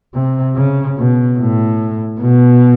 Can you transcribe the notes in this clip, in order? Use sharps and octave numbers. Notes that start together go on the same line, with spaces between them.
C3
C#3
B2
A2
B2